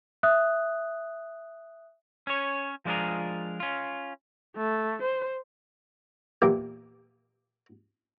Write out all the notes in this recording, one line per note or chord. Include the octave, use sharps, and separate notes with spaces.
E5 D#6 F#6
C#4 C#5
F3 G#3 D4 F4 G#4 A#4
C#4 F4
A3
C5
E2 A#2 E3 A#3 G4